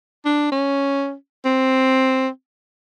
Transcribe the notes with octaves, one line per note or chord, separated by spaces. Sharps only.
D4
C#4
C4